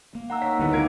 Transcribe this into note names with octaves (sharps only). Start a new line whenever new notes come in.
A#3
D#3 F#5 A#5 E6
D#4 C#5 F#5 B6
D2 D#3 E3 G3 B3
F4 G4 A#4 G#6 D7